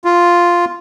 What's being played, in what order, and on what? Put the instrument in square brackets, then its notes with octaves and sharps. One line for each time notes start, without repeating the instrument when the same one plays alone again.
[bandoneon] F4